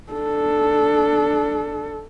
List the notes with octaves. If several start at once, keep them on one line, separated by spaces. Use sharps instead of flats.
D4 A4